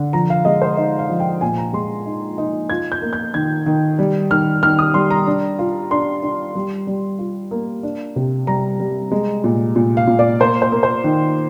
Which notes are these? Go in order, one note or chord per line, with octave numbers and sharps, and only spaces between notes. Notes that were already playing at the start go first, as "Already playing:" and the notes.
Already playing: D3
F3 A#5
F5
G#3 D#5
C5
D#4 D#5
F5
F3
G5
A#2 G#5
A#5
G#3 C6
D#4
D#4
F4 G#6
G6
A#3
G6
D#3 G#6
D#3
G3
D#3 F6
D#3 F6
D#6
G3 C6
A#5
D4
F4
D4 C6
D4
G3
G3
F4
A#3
D4
C3
G3 A#5
G3
G#3
A#2
A#2
F5
A#2
D5
A#3 C5
C5
A#3
C5
D#3